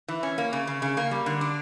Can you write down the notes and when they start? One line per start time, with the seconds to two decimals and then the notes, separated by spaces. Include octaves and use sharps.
0.08 E3
0.23 C#4
0.38 A#3
0.53 C#3
0.67 C#3
0.82 C#3
0.97 A#3
1.11 G3
1.26 D3
1.41 D4